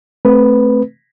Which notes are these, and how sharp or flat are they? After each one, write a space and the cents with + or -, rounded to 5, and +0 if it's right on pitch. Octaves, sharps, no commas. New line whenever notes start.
A3 +0 C4 +0 B4 +0